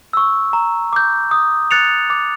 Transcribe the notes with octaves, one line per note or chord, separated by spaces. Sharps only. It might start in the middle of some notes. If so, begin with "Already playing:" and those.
C#6 E6
A#5
D6 G6
D#6
F#6 A6 C#7 F7
D6